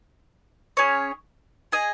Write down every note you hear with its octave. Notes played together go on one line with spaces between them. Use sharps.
C#4 G#4 C#5
G#4 D#5 G#5